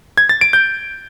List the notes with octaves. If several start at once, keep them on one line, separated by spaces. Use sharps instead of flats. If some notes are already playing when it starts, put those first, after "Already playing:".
G#6
A6
D7
G6